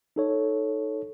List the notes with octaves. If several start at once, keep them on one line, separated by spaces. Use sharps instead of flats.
D#4 A4 C#5